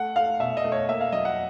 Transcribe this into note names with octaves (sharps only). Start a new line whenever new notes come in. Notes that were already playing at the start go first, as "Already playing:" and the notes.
Already playing: A3 F#5
A3 F5
B2 E5
D#5
A3
C#5
A#3 E5
F5
F#3 D#5
F#5